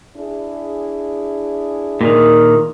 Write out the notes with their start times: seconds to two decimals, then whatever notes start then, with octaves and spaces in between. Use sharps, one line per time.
0.17 D4 E4 G#4
2.01 A#2 D#3